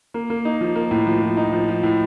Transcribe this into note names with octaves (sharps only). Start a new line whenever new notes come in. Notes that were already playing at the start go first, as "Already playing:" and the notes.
A#3
A#3
D#4
F3
A#3
A2
F3
F3
D#4
F3
F3
A2